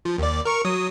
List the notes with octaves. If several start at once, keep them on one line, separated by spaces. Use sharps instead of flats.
F3
D#2 D5
A#4 C#6
F#3 D#6